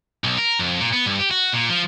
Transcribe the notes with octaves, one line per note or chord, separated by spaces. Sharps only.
B1
A#4
F2
A#2
B3
G2
G4
F#4
A#2
F3